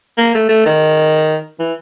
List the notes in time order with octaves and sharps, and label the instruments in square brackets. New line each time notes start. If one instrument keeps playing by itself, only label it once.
[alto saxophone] A#3
A3
A3
D#3
E3